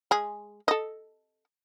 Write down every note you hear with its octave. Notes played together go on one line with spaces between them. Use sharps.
G#3 G#4
A4 D#5